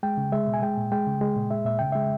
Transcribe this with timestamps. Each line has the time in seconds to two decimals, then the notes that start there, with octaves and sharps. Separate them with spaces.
0.03 G#3 G5
0.17 C#3
0.32 G#3 E5
0.48 B2
0.54 G#5
0.62 G#3 G5
0.78 A#2
0.92 G#3 G5
1.07 C#3
1.21 G#3
1.36 A#2
1.51 G#3 E5
1.66 A#2 E5
1.79 C#3 G5
1.92 G#3 E5